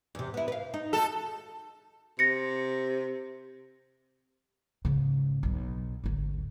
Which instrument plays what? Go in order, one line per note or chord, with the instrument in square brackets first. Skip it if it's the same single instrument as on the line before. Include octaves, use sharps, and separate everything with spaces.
[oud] E2 C3
B3 E4
B4 F5
D#4
[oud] D#4 F#4 [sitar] A4
[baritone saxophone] C3 [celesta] A#6 C#7
[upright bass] G#2 C#3
B1 B2
G#1 D2